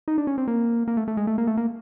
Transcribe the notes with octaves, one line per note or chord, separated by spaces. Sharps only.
D#4
D4
C#4
C4
A#3
A#3
A3
A3
G#3
A3
A#3
A3
A#3